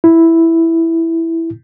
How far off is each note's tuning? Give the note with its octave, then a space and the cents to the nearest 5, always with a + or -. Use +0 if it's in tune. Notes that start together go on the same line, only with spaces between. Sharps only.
E4 +0